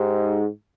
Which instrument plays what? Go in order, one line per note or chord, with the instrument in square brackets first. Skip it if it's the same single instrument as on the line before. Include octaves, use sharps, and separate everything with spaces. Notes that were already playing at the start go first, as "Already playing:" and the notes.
Already playing: [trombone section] G#2 [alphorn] G4